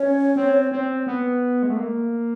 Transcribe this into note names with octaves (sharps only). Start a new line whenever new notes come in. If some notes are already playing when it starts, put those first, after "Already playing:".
Already playing: C#4 C#5
C4
C4
B3
G#3
A3
A#3